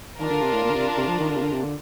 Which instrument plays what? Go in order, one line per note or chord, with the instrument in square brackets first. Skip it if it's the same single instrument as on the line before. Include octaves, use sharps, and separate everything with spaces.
[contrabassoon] D#3 [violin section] D4 F4 A#4
[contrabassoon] D3
C3
A2
A#2
D3
C3
C3
F3
D#3
D3
C3
D3
C3
D3